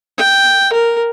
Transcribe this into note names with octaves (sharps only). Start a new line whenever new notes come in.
G5
A#4